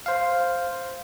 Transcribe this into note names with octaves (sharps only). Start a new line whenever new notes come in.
C5 F5